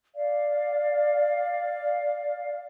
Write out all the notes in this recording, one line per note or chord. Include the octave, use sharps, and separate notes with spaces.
D5 F5